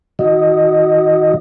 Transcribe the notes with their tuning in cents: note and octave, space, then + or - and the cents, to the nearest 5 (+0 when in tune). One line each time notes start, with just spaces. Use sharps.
D#3 +40 F#4 +0 D#5 +0